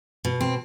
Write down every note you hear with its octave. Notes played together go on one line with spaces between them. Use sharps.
B2
C4